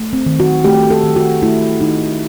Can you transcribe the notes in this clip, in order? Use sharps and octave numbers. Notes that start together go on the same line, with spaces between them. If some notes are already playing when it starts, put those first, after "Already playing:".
Already playing: A3
C4
D#3
F#4
A3 G4
A4
D#3
F#4
A3 E4
D#3 D#4